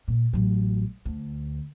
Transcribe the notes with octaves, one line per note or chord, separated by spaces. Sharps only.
A#2
A1 F#3
D2